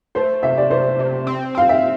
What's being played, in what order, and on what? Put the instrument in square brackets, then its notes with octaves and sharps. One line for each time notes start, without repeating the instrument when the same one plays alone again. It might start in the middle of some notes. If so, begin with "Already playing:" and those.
[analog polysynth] A3 [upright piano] C5
[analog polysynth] C3 [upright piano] E5
[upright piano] D5
[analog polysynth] C3 [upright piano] C5
[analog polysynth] C3
C4
[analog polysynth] C4 [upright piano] F5
[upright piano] E5